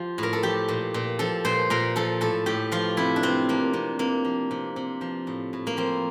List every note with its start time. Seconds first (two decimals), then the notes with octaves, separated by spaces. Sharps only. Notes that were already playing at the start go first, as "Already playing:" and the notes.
Already playing: F3 F4 G4
0.18 A2 A#4
0.33 A4
0.43 F3 G4
0.68 A#2
0.94 A#2
1.19 F3 A4
1.45 A#2 C5
1.70 A#2 A#4
1.96 F3 A4
2.21 A2 A4
2.46 A2 G4
2.72 F3 F4
2.97 C3 E4
3.16 D4
3.23 C3 C4
3.49 F3 A#3
3.73 C3
3.99 C3 A#3
4.25 F3
4.51 C3
4.76 C3
5.01 F3
5.27 A2
5.53 A2
5.67 A#3
5.77 F3 C4